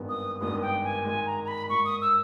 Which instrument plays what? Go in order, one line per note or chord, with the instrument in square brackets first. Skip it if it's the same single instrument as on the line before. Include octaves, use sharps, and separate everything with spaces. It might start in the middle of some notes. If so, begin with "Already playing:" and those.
Already playing: [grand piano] G#1 G2 D#3 G#3 B3
[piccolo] D#6
[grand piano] G#1 G2 D#3 G#3 B3 [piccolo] D#6
[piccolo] G5
G#5
[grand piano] G#2 D#3 G#3 [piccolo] G#5
[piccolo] A#5
A#5
B5
[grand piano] G#2 D#3 G#3 [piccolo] C#6
[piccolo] D#6
E6